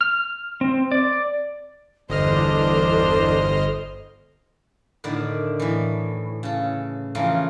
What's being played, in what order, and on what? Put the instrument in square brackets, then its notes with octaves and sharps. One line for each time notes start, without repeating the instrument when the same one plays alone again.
[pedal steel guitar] F6
C4
D5
[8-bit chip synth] G1 D#5 F6 [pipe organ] E2 D4 [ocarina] A4 [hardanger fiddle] C5
[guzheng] A2 D3 D#3 E4 D5
A2 E3
C#3 A4
C#3 E3 F3 A3 A#4